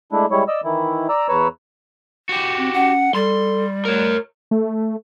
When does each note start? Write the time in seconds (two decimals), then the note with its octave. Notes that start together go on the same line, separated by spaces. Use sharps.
0.12 G#3 A3 D4 E4
0.31 G3 G#3 E4 C#5
0.48 D5 D#5 E6
0.64 D#3 E3 E4
1.09 D5 A#5 E6
1.29 E2 B4 C#5 A#5 E6
2.29 F#4 G4
2.58 C4
2.75 C#4 F#5
3.15 G3 A4 C6
3.85 A3 A#4 C#5
4.51 A3